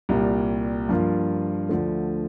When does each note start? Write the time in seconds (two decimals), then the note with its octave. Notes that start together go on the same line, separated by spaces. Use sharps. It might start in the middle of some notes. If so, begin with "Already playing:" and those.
0.09 C2 A#2 G3
0.89 G2 F3 A#3 F4
1.69 D2 D3 F3 A3